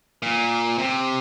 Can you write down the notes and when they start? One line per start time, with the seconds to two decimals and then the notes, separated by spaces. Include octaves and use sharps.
0.22 A#2
0.78 C3